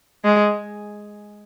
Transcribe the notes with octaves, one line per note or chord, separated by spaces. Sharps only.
G#3